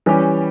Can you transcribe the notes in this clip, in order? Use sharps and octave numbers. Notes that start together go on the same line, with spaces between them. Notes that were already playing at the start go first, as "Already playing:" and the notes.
E3 G3 C#4 G4